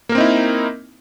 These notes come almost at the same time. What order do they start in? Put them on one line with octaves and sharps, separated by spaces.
A#3 A#4 C4 D#4 E4